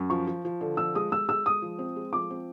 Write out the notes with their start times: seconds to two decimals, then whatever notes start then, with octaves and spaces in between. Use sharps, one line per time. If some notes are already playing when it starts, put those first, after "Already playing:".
Already playing: F#2
0.10 F3 C#6
0.27 F3
0.45 F3
0.61 D3
0.77 F3 E6
0.95 G#3 D#6
1.12 G#3 E6
1.28 G#3 E6
1.45 G#3 D#6
1.62 F3
1.79 C4
1.96 G#3
2.13 F3 D6
2.30 C4